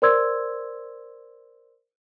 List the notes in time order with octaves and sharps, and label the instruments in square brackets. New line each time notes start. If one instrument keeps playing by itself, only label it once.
[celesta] A#4 C5 D5 C6 E6 G#6